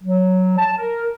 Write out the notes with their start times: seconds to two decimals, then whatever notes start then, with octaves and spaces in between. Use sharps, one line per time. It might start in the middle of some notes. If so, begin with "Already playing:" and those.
0.03 F#3
0.58 A5
0.78 A#4